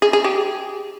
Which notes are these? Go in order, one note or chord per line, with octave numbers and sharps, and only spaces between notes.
G#4
G#4
G4